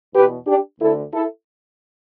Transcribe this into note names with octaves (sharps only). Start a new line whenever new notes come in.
E2 B2 G4 B4
D4 G4
D2 D3 E4 A4
E4 A4